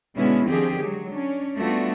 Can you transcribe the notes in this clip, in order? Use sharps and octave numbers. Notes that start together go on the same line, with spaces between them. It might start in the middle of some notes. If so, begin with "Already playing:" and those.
B2 D3 G#3 B3 C#4 E4
D3 D#3 F3 C4 G4 G#4
F#3 G#3
C#4 D4
G3 A3 B3 D4 F4 F#4